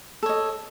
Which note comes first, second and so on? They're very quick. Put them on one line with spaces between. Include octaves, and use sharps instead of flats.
A4 C#5 D#5